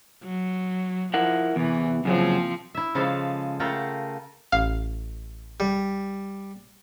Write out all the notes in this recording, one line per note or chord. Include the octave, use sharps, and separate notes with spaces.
F#3
F3 E4 A#4 F#5
E2 C3 E3
F#2 C#3 F3 F#3 A#3 C4
E4 E5
C#3 F3 G#3 A4 F5
C#3 A3 F4 A#4 F#5 G5
A1 F5
G3